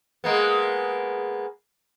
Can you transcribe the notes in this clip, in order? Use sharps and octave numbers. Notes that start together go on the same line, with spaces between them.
G#3 A#3 B3